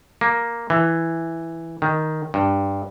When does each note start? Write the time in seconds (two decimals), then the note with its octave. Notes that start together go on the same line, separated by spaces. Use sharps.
0.21 A#3
0.70 E3
1.82 D#3
2.34 G2